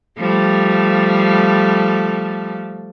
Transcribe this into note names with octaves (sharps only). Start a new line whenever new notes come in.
F3 G3 A3